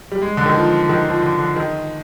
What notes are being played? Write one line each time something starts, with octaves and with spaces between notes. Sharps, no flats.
G3
G#3
D3
D#3
F3
D#3
F3
D3
D3
D#3